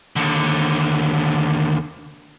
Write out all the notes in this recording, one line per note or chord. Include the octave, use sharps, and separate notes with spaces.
D#2 D3